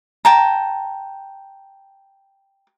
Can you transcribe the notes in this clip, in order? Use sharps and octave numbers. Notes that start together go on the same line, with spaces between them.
G5 A5 A#5